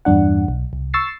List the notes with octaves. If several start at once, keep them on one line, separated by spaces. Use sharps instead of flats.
E2 G2 D4 F#5
B1
C2
C#6 E6 A6 C7